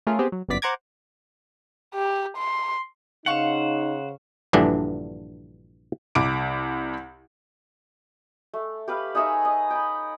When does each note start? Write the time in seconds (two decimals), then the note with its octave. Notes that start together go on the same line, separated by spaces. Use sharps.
0.07 A3 C#4 F4 G#4 A#4
0.19 B3 C4 G4 G#4
0.32 F#3
0.49 G1 F#2 B3 D5 B6
0.62 C5 F#5 A#5 D6 G#6
1.95 G4
2.37 C6
3.26 C#3 D#4 C5 F5 F#5 C#6
4.53 A#1 G2 D3 E3 D4
6.15 C2 D6 D7
8.53 A3
8.88 G4 B4 F5
9.15 D#4 G#4 C#5 E5
9.45 D#5
9.70 G5 B5